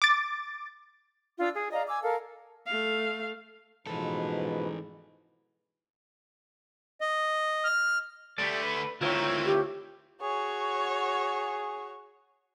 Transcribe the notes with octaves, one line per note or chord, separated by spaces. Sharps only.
D6 A6
D4 F4 E6
G#4
D5 D#5 F5 A#5
G#5 D6 E6
A4 A#4 F5
A3 F5
G#2 B2 E3 F3 A4 B4
D#5
F6
D3 A3 G4 D5
B4
D2 D#3 C4 E4 F4 C5 C#5
G4
F#4 G#4 C#5